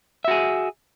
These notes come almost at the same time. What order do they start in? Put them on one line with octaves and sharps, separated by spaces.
E5 F#4 G#4